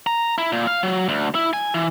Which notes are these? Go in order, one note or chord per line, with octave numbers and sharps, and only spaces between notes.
A#5
E4
A#2
F5
F#3
D2
E4
G#5
E3